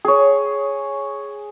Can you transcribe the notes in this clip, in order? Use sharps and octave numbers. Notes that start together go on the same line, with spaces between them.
G#4 C#5